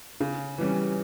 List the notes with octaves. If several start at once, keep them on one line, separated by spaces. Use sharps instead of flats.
C#3
E3 G3 C#4